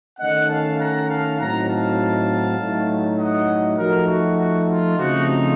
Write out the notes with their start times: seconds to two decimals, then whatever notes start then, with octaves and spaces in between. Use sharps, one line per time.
0.19 D#3 A3 C#4 D#5 F#5
0.49 F5 A5
0.79 F#5 A#5
1.09 F5 A5
1.38 A2 F#3 C4 D#4 F#5 A#5
1.69 F5 A5
2.58 A2 F#3 A3 D#4
3.18 D#5 F#5
3.78 F3 A3 D#4 F#4 A#4
4.09 F#4
4.38 F#4
4.69 F4
4.97 C#3 F3 A3 C4 D#4 F#4